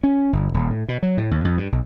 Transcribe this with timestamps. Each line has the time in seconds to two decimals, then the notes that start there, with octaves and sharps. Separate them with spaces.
0.03 C#4
0.33 G1
0.54 D#1
0.70 A2
0.88 B2
1.03 F#3
1.17 A2
1.31 D#2
1.45 F2
1.57 G2
1.72 B1